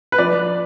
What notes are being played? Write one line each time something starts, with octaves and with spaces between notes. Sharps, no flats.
B4
F3 D5